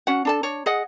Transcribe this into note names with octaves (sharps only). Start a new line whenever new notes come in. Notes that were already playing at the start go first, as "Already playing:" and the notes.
C#4 F#4 F#5
D4 A4 A5
D4 C#5
G#4 D#5 F#5